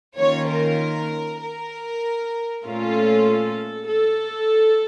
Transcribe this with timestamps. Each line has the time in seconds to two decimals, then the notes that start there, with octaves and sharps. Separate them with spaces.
0.18 D#3 A#3 C#4 F4 C#5
0.49 A#4
1.42 A#4
2.65 A#2 A3 C#4 F4 A4
3.89 A4